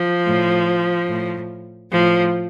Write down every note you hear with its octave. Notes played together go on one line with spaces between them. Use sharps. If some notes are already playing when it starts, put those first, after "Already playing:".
Already playing: F3
A2
A2
A2 F3